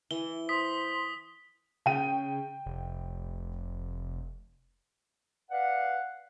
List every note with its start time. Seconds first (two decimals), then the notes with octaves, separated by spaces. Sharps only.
0.11 E3 G7
0.49 C5 D#6 B6
1.86 C#3 G5 D#7
2.66 F1
5.50 B4 D5 F5 F#5